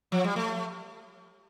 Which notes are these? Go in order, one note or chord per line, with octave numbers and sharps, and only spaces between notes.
F3
G3
A3